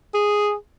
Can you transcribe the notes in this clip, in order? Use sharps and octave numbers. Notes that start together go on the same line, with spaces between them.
G#4